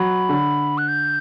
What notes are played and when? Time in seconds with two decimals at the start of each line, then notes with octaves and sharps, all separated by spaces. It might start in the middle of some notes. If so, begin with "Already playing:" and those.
Already playing: F#3 B5
0.29 D3
0.78 F#6
0.88 G6